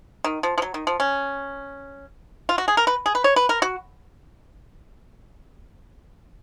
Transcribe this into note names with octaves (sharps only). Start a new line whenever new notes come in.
D#3
F3
F3
F#3
D#3
F3
C#4
F4
F#4
G#4
A#4
B4
G#4
B4
C#5
B4
A#4
F#4